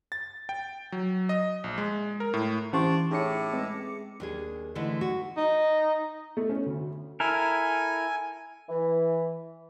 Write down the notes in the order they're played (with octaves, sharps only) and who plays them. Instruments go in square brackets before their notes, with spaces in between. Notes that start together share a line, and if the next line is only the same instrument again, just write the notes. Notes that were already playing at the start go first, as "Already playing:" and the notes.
[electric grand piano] A6
G5
F#3
D#5
A#1
G#3
A#4
A2
[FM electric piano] E3 C5 C6 [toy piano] C#4 G4 [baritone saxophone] D4 [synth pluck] F5
[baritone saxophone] A2 [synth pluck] D#4 C#5 E5 [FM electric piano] G#4 D6 C#7
[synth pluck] G#3 C4 B4
[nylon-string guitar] D#2 D4 G#4
D3 E3 G#3 A3 D#4
F#4
[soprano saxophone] D#4
[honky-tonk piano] A3
C#4
D2
[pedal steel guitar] E4 A4 A#4 [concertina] G#5
[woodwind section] E3